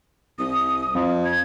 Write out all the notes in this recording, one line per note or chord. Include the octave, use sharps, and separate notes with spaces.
C2 D#6
F2
G#6